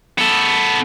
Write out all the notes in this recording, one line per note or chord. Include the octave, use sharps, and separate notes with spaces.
B3 A4